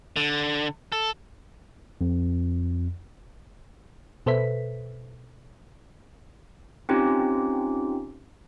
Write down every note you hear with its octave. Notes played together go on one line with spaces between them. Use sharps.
D3
A4
F2
B2 A4 B4 C5 E5 B6
C4 C#4 D#4 F4 G4